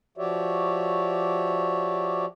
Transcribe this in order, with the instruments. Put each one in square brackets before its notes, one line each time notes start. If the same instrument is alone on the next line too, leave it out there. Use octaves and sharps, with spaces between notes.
[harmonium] F3 F#4 G4 C#5 D5 E5